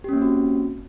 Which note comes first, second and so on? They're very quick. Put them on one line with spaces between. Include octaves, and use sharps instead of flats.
G4 C#4 A#3 C4 F#4